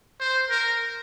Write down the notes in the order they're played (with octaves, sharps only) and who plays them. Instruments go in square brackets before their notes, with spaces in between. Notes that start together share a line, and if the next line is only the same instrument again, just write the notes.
[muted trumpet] C5
A#4